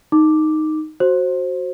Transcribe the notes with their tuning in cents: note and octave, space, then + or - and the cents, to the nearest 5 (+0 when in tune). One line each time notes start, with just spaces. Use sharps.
D#4 +0 D6 +0
F#4 +0 C5 +15